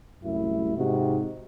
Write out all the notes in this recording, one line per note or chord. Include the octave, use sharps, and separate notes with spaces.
C2 F#2 A2 E4
G#2 C3 D#4 F#4